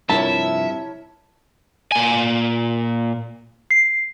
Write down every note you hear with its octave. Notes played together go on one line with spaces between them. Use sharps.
G2 C3 F3 E4 A#4 C#5 E5 A5
A#2 G#5
C7